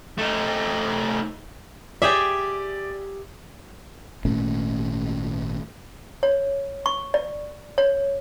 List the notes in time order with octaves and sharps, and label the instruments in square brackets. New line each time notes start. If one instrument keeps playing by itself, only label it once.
[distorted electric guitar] A3 D#4
[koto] G4 G#4 E5 [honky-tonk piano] D5
[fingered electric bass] G#1 A#2 A3 C#4
[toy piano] C#5
C#6
D5
C#5